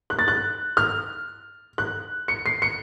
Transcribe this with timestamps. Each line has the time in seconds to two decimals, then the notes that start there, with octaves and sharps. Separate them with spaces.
0.10 F#6
0.19 A6
0.28 F#6
0.77 F6
1.78 F#6
2.28 C#7
2.46 C7
2.62 C#7